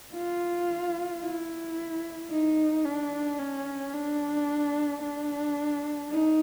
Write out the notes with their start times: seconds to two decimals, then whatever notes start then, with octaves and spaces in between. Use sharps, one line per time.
0.13 F4
1.21 E4
2.30 D#4
2.85 D4
3.39 C#4
3.93 D4
5.02 D4
6.11 D#4